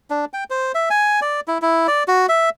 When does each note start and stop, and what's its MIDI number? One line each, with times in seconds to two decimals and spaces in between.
0.10 0.25 62
0.33 0.44 79
0.50 0.72 72
0.75 0.89 76
0.90 1.20 80
1.22 1.40 74
1.48 1.58 64
1.62 1.87 64
1.88 2.03 74
2.08 2.26 66
2.29 2.50 76